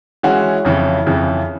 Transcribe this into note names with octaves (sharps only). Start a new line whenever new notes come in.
E3 G#3 C#4 F#4
F2 C#3 E3
F2 C#3 E3